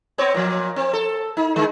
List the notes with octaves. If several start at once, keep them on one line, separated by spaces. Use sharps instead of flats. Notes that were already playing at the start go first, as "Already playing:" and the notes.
B3 C4 C#5
A#2 F3
C4
A4
D#4
D3 G#3